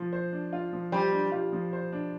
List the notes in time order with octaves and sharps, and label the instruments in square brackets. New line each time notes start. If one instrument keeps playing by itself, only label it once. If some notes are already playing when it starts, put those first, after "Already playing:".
Already playing: [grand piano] F3 F4
C5
D4
F4
F3
[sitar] G3 [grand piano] C5
[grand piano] D4
F4
F3
C5
D4